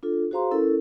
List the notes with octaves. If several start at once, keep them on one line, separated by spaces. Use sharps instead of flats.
D4 F4 A4
F#4 G#4 C5 F5 A#5 C6
C#4 E4 A4 A#4